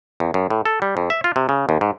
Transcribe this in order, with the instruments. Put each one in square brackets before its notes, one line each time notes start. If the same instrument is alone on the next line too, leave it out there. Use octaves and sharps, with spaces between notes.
[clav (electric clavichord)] E2
F#2
A2
A4
G3
F2
E5
F4
C3
C#3
D#2
G#2